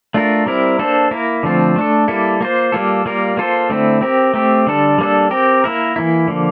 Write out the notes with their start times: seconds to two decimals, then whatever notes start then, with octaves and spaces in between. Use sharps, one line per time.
0.14 A3 D4 F4 A#4
0.46 G3 C4 E4 A#4
0.79 A#3 D4 A4 C5
1.11 A#3 E4 A#4
1.43 D3 F3 A3 C4 F4
1.76 A3 D4 A4
2.08 G3 A#3 E4 A4
2.41 A#3 F4 C5
2.72 G3 A#3 F4 A4
3.06 G3 A#3 F4 A#4
3.37 A#3 F4 A4 C5
3.70 D3 A3 C4 E4
4.01 C4 G4 A#4
4.34 A3 C4 G4
4.67 D3 G3 D4 A4
4.98 G3 A#3 D4 A4
5.31 C4 G4 A#4
5.64 A#3 E4 A#4
5.96 E3 A#3 E4
6.28 D3 F3 A#3